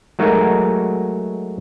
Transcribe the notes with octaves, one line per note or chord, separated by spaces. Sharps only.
F#3 G#3 A3 D#4 F#4 A#4